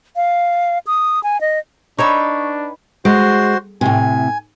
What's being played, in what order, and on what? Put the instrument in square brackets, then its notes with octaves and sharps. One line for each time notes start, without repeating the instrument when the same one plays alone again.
[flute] F5
D#6
G#5
D#5
[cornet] D4 [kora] D#4 C#5 E5 [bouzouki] B4 G5 [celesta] C#6
[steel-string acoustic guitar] G#3 [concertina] F#4 C5 C6
[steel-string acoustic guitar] A2 C3 [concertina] G#5